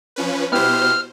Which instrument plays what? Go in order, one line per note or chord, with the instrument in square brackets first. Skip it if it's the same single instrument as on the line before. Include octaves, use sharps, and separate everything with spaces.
[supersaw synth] F3 C#4 B4
[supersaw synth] B2 C5 [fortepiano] B3 E4 G4 [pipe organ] F6